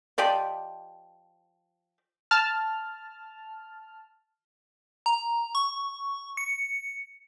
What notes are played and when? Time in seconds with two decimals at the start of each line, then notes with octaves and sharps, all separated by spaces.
0.18 F3 G4 D5 D#5
2.31 A5 F6
5.06 A#5
5.55 C#6
6.37 C#7